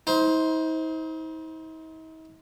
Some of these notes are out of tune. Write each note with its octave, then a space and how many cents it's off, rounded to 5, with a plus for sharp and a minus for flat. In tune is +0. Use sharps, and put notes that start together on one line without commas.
D#4 +45 C5 +0